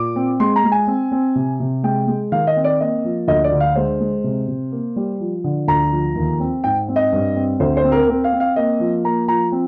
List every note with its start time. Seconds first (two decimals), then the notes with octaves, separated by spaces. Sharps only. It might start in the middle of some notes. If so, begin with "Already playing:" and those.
Already playing: A#2 D6
0.16 C4
0.40 G#3 C6
0.56 A#5
0.64 G#3
0.72 G#5
0.87 C4
1.12 C4
1.35 C3
1.60 C3
1.83 G#3 G5
2.08 G#3
2.32 D#3 F5
2.47 D#5
2.56 C4
2.64 D5
2.80 A#3 D#5
3.05 F3
3.28 D2 D#5
3.44 D5
3.52 D3
3.60 F5
3.76 G#3 C5
4.00 G#3
4.24 C3
4.48 C3
4.72 A#3
4.96 G3
5.20 F3
5.44 D3
5.68 D2 A#5
5.92 F3
6.16 D#2
6.40 C4
6.64 G#2 G5
6.88 C4
6.96 D#5
7.13 G2
7.36 C4
7.60 D2 C5
7.77 C5
7.84 C4
7.92 A#4
8.08 C4 A#4
8.24 F5
8.33 C4
8.40 F5
8.56 A#3 D#5
8.80 F3
9.04 A#3 A#5
9.28 F3 A#5
9.52 C4